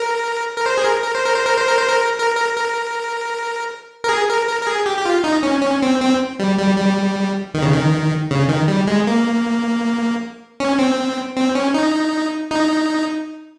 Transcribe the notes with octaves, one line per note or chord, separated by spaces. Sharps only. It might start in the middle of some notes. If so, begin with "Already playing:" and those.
Already playing: A#4
A#4
C5
G#4
A#4
A#4
C5
A#4
C5
A#4
C5
A#4
C5
A#4
A#4
A#4
A#4
A#4
G#4
A#4
A#4
A#4
G#4
G4
G4
F4
D#4
C#4
C#4
C4
C4
G3
G3
G3
D#3
C#3
D#3
C#3
D#3
G3
G#3
A#3
C#4
C4
C4
C#4
D#4
D#4